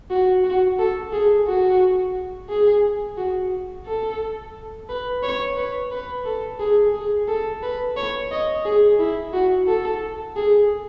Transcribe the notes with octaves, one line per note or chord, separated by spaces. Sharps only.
F#4
F#4
A4
G#4
F#4
G#4
F#4
A4
B4
C#5
B4
B4
A4
G#4
G#4
A4
B4
C#5
D#5
G#4
E4
F#4
A4
G#4